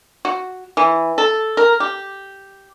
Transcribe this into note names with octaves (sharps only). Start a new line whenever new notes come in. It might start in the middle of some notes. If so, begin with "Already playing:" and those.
F#4
E3
A4
A#4
G4